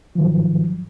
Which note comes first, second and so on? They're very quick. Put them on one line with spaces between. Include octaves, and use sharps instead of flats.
F3 D#3 F#3 G#2